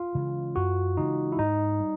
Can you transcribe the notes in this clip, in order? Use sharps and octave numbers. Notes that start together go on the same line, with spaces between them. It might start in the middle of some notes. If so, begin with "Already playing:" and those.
Already playing: F4
C#3 E3 G#3
F#2 F#4
C#3 E3 G#3 D#4
E4
G#2 D#4
G3